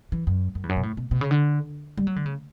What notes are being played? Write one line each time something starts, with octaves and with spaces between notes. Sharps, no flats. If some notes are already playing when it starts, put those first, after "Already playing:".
E3
F#2
F#2
E2
F#2
B2
A2
B2
B2
C#3
D3
G3
F#3
D3
C#3